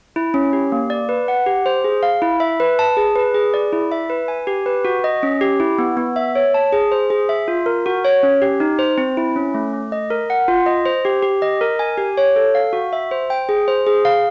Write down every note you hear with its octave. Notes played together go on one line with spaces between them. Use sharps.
E4
C#4
G4
A#3
D5
B4
F#5
G4
C5
G#4
F5
E4
E5
B4
A5
G#4
B4
G#4
D5
E4
E5
B4
G#5
G4
B4
F#4
D#5
C#4
G4
E4
B3
B3
E5
C#5
A5
G#4
C5
G#4
E5
F4
A#4
F#4
C#5
C#4
G4
D#4
C5
C4
E4
C#4
A3
A3
D#5
A#4
F#5
F4
D#5
C5
G4
G4
D#5
A#4
G#5
G4
C#5
A4
F5
F#4
E5
C5
G5
G#4
C5
G#4
F5